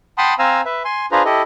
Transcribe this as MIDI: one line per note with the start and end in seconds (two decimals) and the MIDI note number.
0.18 0.34 78
0.18 0.34 79
0.18 0.34 81
0.18 0.34 83
0.18 0.34 84
0.18 0.34 87
0.39 0.61 60
0.39 0.61 72
0.39 0.61 77
0.39 0.61 80
0.39 0.61 82
0.39 0.61 88
0.66 0.83 71
0.66 0.83 76
0.85 1.06 80
0.85 1.06 84
1.12 1.23 62
1.12 1.23 65
1.12 1.23 68
1.12 1.23 71
1.12 1.23 72
1.12 1.23 82
1.25 1.42 64
1.25 1.42 67
1.25 1.42 69
1.25 1.42 75